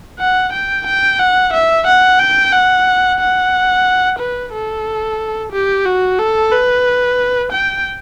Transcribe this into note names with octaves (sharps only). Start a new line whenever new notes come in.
F#5
G5
G5
F#5
E5
F#5
G5
F#5
F#5
B4
A4
G4
F#4
A4
B4
G5